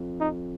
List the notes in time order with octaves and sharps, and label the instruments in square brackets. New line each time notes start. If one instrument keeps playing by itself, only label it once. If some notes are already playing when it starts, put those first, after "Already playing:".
Already playing: [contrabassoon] F2
[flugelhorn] D#4